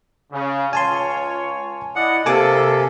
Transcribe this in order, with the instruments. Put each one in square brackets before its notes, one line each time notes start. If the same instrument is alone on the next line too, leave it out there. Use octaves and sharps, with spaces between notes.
[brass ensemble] C#3
[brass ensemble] C#2 F4 C#5 [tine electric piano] G#5 A5 C6
[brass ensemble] E4 D5 D#5 [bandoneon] F#5
[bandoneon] C3 A#3 [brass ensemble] A4 [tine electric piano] G#5 A5 D6